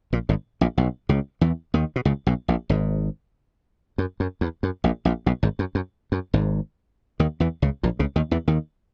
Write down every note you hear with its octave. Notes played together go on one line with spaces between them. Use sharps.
A#1 A#2
G#1 G#2
A#1 A#2
B1 B2
C#2 C#3
E2 E3
D#2 D#3
B2
C#2 C#3
B1 B2
A#1 A#2
G#1 G#2
F#2
F#2
E2
F#2
A#1 A#2
A#1 A#2
B1 B2
G#1 G#2
F#2
F#2
F#2
G#1 G#2
D#2 D#3
E2 E3
C#2 C#3
A#1 A#2
C#2 C#3
D#2 D#3
E2 E3
D#2 D#3